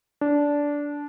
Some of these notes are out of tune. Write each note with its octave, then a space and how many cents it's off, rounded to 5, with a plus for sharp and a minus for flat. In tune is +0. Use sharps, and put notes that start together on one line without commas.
D4 -15